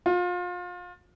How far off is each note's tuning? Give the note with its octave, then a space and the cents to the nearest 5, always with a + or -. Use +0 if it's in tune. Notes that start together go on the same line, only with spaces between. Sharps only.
F4 +30